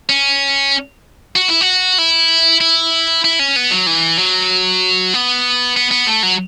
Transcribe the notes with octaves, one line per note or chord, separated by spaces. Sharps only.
C#4
F#4
E4
F#4
E4
E4
E4
C#4
B3
F#3
E3
F#3
B3
B3
B3
A3
F#3